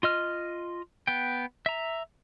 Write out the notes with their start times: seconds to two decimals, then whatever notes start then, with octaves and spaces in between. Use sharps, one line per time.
0.03 F4 D#5 F6
1.07 B3 G5
1.66 E5 A#5